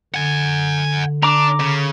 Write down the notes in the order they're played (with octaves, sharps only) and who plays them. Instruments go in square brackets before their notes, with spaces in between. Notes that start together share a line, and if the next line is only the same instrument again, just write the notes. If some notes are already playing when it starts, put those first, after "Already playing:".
[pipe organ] D3 [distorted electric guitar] F#5 G#5
[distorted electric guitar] D4 [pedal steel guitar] A#5 D6
[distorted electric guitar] C#3